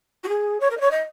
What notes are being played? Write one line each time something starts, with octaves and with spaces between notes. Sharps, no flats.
F#4
G#4
C#5
A#4
D#5
C#5
D#5